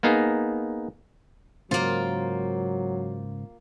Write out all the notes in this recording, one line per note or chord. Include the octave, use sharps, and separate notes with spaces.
A#3 B3 D#4 G#4
G#2 C#3 F#3 A#3 F4 C5